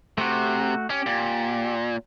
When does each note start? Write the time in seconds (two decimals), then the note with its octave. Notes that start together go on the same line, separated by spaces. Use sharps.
0.18 C3 A3 F#4
0.90 C#4 G4
1.06 A#2